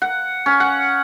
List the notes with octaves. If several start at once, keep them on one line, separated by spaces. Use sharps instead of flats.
F#5
C#4
F#5